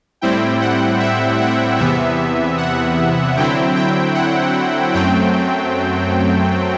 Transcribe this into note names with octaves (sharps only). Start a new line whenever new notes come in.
A2 G3 C4 E4 G5
F#5
E5
F#5
E2 C3 E3 B3 E5
F#5
D3 F#3 C4 E4 G5
G5
F#5
F#2 F#3 A3 C4 G5